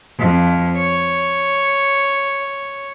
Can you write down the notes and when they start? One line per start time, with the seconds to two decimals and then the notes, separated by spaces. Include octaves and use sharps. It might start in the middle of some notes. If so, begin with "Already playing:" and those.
0.19 F2
0.77 C#5